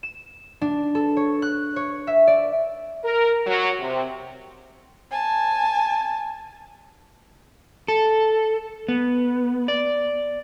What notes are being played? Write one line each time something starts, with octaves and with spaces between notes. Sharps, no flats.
E7
D4
A4
C#5
F#6
C#5
E5
D5
A#4
F#3
C3
G#5 A5
A4
B3
D5